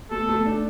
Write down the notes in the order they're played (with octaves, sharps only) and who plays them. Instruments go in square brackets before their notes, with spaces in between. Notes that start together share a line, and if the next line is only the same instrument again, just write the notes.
[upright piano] A3 [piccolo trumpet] A4
[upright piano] A3
D4